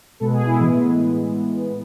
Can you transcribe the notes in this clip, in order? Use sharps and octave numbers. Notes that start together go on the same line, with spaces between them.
B2 G#3 B3 A4
G#4
E4
A2 E3 G#3 B3